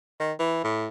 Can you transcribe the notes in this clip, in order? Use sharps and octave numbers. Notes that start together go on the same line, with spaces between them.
D#3
E3
A2